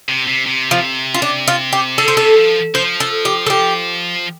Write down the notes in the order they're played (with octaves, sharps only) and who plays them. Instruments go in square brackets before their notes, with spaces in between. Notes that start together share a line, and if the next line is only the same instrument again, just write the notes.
[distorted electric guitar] C3
C3
C3
[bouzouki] F3
F4
D4
F4
G4
[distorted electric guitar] D3 [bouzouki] A4
[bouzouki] C5
[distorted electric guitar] C3 [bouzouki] A4
[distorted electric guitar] F3
[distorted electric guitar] F3 [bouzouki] C5
[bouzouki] A4
G4
A4
G4